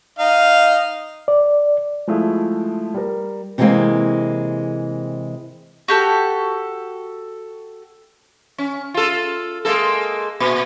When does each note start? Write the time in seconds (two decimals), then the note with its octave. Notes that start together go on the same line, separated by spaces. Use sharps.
0.19 D#4 F5
1.28 D5
2.07 F3 G#3 A3 E4
2.94 G3 A#4
3.58 C3 E3 G3 G#3 A#3 C4
5.88 F#4 G4 A4
8.58 C#4
8.94 F4 A4
9.65 G#3 A#3 A4
10.40 A#2